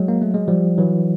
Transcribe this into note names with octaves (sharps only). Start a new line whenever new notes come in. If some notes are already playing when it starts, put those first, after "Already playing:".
Already playing: F#3 G#3
A#3
A3
G#3
F3 G3
E3 F#3